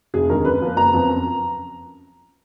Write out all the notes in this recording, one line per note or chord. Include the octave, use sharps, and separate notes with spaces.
F1 G#4
D#2 D3 G#3 A#4
F#2 B4
F3 A#3
F#1 A#5
F2 F3 B3
F#2